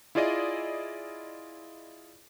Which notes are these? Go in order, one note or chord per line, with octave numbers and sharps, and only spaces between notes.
E4 F4 G#4 D5 D#5